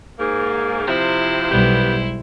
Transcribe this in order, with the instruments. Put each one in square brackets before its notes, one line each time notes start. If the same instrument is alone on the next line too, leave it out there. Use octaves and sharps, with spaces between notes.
[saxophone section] G#2 A#3
[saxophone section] C3 F3 [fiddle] E4 C5
[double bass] B1 G3 [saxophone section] B3 G4 B4